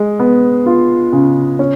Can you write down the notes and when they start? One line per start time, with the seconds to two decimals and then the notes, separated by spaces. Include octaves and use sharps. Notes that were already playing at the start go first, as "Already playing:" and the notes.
Already playing: G#3
0.20 B3
0.66 F4
1.12 C#3
1.59 C#4